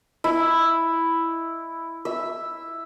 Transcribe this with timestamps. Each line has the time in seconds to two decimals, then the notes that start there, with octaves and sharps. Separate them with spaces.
0.24 E4
2.05 E5